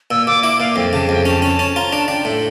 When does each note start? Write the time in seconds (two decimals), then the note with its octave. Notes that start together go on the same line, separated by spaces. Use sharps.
0.11 A#2 E6
0.27 A#2 D6
0.43 E4 D6
0.60 A#2 F5
0.76 F2 G5
0.93 C#3 A5
1.09 F2 G5
1.25 C#4 A5
1.42 C#4
1.59 C#4
1.76 F4 A#5
1.92 D4 A5
2.08 D4 G5
2.25 A2